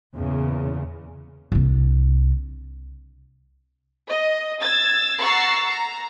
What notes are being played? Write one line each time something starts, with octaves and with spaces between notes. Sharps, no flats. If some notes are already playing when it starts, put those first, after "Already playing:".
E2 A#2 C#3
C2 D4
D#5
E6 G#6 A6
F#5 A#5 C#6 E6 A6 C7
A#5